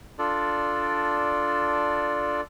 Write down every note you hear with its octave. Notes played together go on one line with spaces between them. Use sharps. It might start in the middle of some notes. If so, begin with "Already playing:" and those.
D4 F4 A4 D5